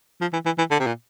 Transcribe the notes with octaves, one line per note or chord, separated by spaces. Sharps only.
F3
E3
E3
E3
D3
C3
A#2